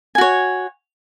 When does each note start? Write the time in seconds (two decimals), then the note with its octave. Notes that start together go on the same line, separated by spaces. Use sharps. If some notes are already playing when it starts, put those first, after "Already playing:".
0.15 G#5
0.18 F#4
0.21 C#5